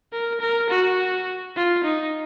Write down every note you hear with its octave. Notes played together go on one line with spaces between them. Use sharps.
A#4
A#4
F#4
F4
D#4